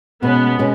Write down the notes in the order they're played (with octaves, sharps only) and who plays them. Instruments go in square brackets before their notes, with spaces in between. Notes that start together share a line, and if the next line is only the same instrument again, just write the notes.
[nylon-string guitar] B2 G#3 C#4 [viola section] B3
[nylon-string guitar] B2 G#3 C#4